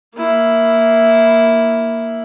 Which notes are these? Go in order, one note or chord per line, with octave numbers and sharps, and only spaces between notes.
A#3 E4